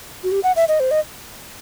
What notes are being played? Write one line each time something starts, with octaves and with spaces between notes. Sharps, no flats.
F#4
G4
F#5
E5
D#5
C5
D#5